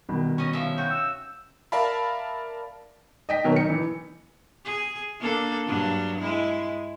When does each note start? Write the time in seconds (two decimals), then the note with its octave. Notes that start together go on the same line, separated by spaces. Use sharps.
0.09 C2 B2 D#3
0.38 C#4 D#5
0.53 F3 E5
0.78 F#4 G5
0.91 E6
1.72 A#4 D5 E5 F5 A5 B5
3.29 D#5 G5 B6
3.44 B2 D#3 F#3 A#4
3.56 D#4 C#7
3.70 E3
4.65 G#4
5.20 A#3 D4 A4
5.66 G2 F#3 D4
6.20 G#3 E4